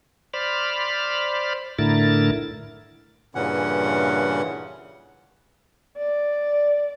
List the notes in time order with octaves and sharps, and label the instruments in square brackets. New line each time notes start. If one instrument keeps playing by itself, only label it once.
[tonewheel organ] C5 D5 B5 F6
A2 D3 E4 A#4 A6
[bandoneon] G2 A#2 C#3 E3 C#4 F#5
[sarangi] D5